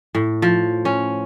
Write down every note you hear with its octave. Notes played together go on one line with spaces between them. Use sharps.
A2
F3
C#4